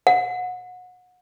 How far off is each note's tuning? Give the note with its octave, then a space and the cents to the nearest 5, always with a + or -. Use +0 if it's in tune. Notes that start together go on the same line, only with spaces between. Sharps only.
F#5 -30